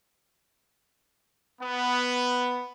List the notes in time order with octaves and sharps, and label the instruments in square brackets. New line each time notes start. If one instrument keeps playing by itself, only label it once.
[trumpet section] B3